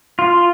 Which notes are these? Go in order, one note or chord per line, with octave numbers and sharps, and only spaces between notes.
F4